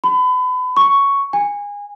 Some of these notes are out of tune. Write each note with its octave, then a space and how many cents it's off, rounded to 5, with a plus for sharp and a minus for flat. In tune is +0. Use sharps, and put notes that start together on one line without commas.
B5 +30
C#6 +5
G#5 -25